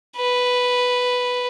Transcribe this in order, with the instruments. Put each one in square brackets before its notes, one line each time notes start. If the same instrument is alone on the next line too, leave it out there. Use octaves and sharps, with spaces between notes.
[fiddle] B4